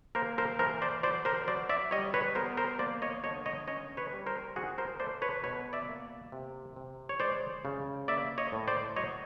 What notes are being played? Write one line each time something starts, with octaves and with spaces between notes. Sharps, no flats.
A#3 A#4 C5
A#4 C5
E3 A#4 C5
C5 D5
F#3 C5 D5
A#4 C5
F#3 C5 D5
D5 E5
G3 C#5 D#5
B4 C#5
B3 A#4 C5
A#4 C5
A#3 C5 D5
C#5 D#5
D3 C#5 D#5
C#5 D#5
C#4 C#5 D#5
B4 C#5
G3
A#4 C5
C4 F#4 G#4
A#4 C5
A3 C5 D5
B4 C#5
B2 B4 C#5
D5 E5
A#3
C3
C3
C#5
G#3 C5 D5
C#3
A#3 D5 E5
C#5 D#5
A2
C5 D5
F#3 C#5 D#5